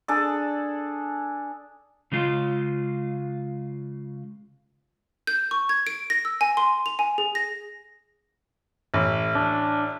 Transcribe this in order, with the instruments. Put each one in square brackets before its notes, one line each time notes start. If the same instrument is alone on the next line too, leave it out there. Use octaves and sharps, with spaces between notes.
[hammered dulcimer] D4 G#4 A4 D5
[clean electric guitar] C#3 G#3 F4
[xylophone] G6
C#6
G#6
D7
A#6
E6
G#5
C6
F7
G#5
G#4
A#6
[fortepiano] A1
[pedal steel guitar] D4